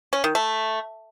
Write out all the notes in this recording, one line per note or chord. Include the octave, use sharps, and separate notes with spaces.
C#4
D#3
A3